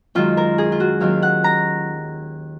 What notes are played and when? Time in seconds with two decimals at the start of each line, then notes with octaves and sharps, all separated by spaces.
0.15 F#2 D#3 G#3 F4
0.37 A#4
0.58 G#4
0.72 F4
0.80 F#4
1.00 D#2 D#3 F#3 C#4 F4 F5
1.23 F#5
1.44 A#5